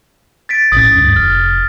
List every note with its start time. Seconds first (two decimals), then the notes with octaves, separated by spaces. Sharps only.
0.49 A6 B6 D7
0.72 A#1 A2 C#4 D#6 A6
0.96 D2 G2 D3
1.16 F1 F6